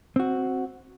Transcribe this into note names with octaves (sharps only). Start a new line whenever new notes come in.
C4 F#4